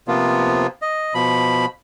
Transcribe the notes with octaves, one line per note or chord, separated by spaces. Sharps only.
C3 F3 A#3 B3 F4
D#5
B2 F3 B5